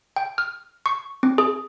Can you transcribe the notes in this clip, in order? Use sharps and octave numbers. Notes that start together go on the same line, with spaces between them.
G5
F6
C#6
C4
G#4